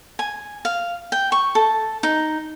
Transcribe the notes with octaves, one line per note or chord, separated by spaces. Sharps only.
G#5
F5
G5
C#6
A4
D#4